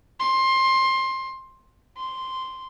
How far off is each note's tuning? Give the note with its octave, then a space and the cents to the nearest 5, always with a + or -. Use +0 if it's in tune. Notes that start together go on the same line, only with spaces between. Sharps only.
C6 +20
C6 -5